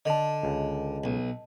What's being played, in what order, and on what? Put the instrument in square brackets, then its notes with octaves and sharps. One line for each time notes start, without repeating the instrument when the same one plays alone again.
[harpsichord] D3 [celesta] D#5 A5
[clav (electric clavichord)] C#2
[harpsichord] B1